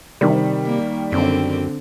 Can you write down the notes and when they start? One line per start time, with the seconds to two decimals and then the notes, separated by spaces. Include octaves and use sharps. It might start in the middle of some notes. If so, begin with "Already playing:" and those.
0.21 C3 D#3 G3
0.65 A#3
1.12 F#2 D3 C4